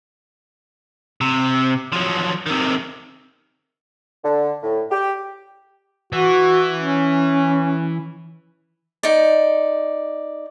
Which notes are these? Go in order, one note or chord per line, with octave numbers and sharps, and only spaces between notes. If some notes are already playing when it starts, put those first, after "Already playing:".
C3
F3 F#3
C3 D#3
D3
A2
G4
E3 F#4
C#4
D#4 D5